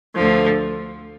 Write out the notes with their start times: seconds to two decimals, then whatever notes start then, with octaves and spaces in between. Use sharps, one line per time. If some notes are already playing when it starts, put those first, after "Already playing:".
0.15 D2 D3 F3